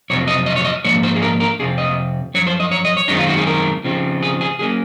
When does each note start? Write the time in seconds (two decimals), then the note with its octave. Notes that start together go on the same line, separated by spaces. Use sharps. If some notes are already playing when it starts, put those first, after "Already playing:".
0.10 F2 C3 F#3 C4 C#5
0.28 D#5
0.46 D#5
0.56 C#5
0.65 D#5
0.84 G#2 F3 A#3 C#5
1.03 C5
1.15 G#4
1.22 A#4
1.40 A#4
1.59 F2 C3 C4 G#4
1.78 D#5
2.34 F#2 F3 C#5
2.47 C5
2.60 D#5
2.71 C#5
2.85 D#5
2.97 C#5
3.08 F#2 D#3 G#3 C4 D#4
3.18 F4
3.28 F#4
3.38 G#4
3.47 A#4
3.84 C#3 F3 C4
4.23 G#4
4.41 G#4
4.59 F#3 A#3 C#4 G#4